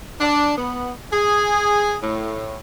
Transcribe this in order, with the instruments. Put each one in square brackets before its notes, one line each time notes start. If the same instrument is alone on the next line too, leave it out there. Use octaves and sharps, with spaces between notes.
[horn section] D4
B3
G#4
A2